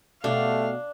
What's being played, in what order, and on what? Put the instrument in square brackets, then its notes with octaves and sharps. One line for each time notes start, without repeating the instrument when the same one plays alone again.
[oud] B2 G4 [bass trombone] A3 [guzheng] D4 [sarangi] F5